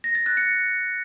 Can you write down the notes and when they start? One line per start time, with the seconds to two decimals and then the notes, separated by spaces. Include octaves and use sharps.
0.04 A#6
0.15 A6
0.26 F#6
0.37 C#7